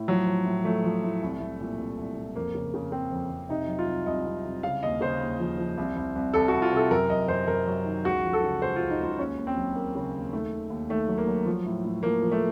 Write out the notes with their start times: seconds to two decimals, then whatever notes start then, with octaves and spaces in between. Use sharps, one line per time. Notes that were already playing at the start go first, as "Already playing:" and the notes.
Already playing: A2
0.08 F3 F#3
0.26 F3
0.46 A2
0.64 F3 A3
0.84 F3
1.03 A2
1.22 C2
1.40 C2
1.60 A#2
1.79 C2
1.98 C2
2.16 A#2
2.36 F2 A#3
2.55 C#3
2.74 C#3
2.92 C#3 C4
3.11 F2
3.30 F2
3.49 C3 D#4
3.68 F#3
3.79 F4
3.87 C2
4.06 C2 D#5
4.26 C2
4.45 C2
4.63 C#3 F5
4.83 D#2 D#5
5.01 C#3 C5
5.21 D#2
5.39 F3
5.58 F3
5.78 C2
5.96 C2
6.16 C2
6.34 C2 A4
6.48 F#4
6.54 C2
6.62 F4
6.72 C3 A4
6.91 F#2 A#4
7.09 F#2 D#5
7.28 F#2 C5
7.48 F#2 A#4
7.67 F#3
7.85 D#3
8.04 C#2 F#4
8.24 F3
8.33 A4
8.43 C#3
8.62 C#2 C5
8.76 C#2 F4
8.90 D#4
9.00 C#2 F4
9.19 D#2 C#4
9.38 D#2
9.47 C4
9.57 F#3
9.75 D#2 A#3
9.95 C#3
10.14 D#2
10.32 D#3 A3
10.52 D#3
10.70 D#2
10.89 D#3 A3
11.08 F#3
11.18 A#3
11.27 F#3
11.46 F3
11.66 A2
11.85 A2
12.03 F3 A#3
12.22 F3
12.32 A3